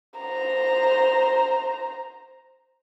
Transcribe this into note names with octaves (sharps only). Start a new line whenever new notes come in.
C5 A#5